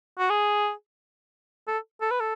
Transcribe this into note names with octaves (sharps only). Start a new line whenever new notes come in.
F#4
G#4
A4
A4
B4
A4